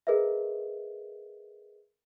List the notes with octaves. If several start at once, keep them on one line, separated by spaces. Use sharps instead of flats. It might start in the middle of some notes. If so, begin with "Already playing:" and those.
G#4 A#4 B4 D#5 E5